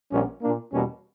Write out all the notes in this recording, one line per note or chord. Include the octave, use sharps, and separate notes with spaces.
A#1 A#2 G3 B3 C#4
A#2 A#3 D4
E2 B2 G3 A#3 C#4